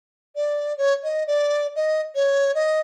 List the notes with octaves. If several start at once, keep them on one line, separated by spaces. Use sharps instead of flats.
D5
C#5
D#5
D5
D#5
C#5
D#5